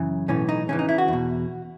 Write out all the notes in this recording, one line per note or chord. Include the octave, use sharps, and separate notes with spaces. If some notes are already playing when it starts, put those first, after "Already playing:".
Already playing: F#2 C#3 E3
B1 A2 E3 C#4
D#4
C#2 C#3 E3 C#4
D#4
E4
F#4
E2 B2